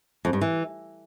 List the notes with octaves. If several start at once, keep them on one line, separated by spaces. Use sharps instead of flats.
F2
G2
E3